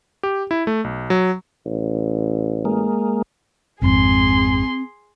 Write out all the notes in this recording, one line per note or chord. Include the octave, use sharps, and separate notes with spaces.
G4
E4
A3
B1
F#3
A1
G#3 A#3
G#1 F2 G#2 C4 G#4 C6